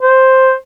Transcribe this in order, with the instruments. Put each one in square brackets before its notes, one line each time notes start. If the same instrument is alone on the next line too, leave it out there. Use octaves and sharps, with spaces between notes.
[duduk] C5